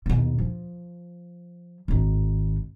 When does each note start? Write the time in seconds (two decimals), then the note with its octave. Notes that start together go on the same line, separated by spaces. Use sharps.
0.06 D#2 B2
0.38 F3
1.88 G#1 D#3